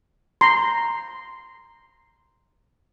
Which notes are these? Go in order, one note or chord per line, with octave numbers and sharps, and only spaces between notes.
A#5 C6